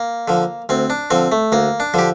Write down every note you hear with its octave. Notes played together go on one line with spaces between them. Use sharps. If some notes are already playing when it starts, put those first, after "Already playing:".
Already playing: A#3
D3 F3
D2 C4
D4
D3 F3 C4
A3
D2 A#3
D4
D3 F3 G4